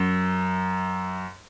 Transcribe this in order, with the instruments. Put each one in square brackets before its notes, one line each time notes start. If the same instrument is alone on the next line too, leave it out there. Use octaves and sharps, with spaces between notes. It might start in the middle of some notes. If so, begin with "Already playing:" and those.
Already playing: [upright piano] F#2